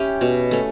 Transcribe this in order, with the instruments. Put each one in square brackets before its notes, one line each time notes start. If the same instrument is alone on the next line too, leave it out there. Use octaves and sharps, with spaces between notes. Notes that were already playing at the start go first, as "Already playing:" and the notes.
Already playing: [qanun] C#4 G4 [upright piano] E4
[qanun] B2
A3 C#4